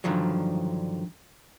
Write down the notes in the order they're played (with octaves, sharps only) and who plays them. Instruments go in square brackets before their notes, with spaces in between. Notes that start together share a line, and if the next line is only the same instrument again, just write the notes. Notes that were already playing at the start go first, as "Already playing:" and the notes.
[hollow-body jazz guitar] G2 D3 D#3 F3 F#3